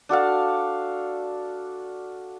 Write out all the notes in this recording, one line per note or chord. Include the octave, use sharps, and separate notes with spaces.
D4 F#4 A4 F5